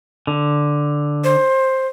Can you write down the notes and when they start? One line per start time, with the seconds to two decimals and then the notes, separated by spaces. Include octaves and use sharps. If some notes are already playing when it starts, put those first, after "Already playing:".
0.27 D3
1.24 C5